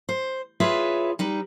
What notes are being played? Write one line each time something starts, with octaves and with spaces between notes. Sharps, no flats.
C5
F4 G#4 B4 C#5 E5
G3 D#4 B4